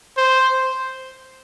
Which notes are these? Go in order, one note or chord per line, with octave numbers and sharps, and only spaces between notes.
C5